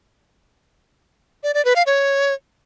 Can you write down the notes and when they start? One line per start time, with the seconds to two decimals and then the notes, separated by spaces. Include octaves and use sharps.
1.43 D5
1.54 D5
1.65 B4
1.76 F5
1.87 C#5